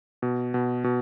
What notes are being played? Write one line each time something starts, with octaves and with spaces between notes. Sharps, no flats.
B2
B2
B2